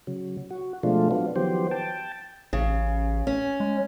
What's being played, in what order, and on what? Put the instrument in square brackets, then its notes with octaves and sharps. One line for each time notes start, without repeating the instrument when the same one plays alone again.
[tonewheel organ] C#3 F#3
F#4
B2 F3 G#3 A3 D4 F4
F#3 B3 D4 F4
D#3 F3 F#3 B3 G4 C5
G5 A5
[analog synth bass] A1 [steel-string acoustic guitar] C#3
[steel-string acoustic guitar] C#4
[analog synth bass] G#3